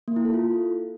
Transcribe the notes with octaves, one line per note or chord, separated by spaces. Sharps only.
A#3
E4
A4
F4